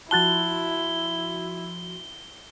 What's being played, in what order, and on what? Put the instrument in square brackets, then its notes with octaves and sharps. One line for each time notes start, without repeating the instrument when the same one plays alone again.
[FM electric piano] F3 F#4 C6 [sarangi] E4 [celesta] A5 F#6 A6 [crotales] G7